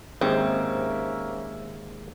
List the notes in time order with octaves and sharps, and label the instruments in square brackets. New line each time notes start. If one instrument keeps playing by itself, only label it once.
[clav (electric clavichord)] D#2 G#2 [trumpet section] A#3 C#4 E5 [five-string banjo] C4